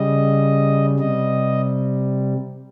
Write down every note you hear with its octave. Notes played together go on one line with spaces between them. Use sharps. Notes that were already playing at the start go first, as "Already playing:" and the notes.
Already playing: C#3 G3 D#5
C3 G3 D#5